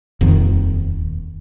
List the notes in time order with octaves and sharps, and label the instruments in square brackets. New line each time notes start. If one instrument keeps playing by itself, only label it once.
[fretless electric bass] D#1 F2 D#3